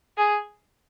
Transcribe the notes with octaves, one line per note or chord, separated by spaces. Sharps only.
G#4